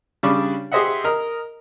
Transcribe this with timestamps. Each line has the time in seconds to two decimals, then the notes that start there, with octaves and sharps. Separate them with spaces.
0.23 C#3 G3 D4 B5 C#6 D6
0.72 G4 G#4 C5 D#5 E5 F#5
1.04 A#4 D#5 A#5